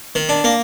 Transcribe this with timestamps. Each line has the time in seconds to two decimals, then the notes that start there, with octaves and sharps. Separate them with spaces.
0.15 D#3
0.29 D4
0.44 A#3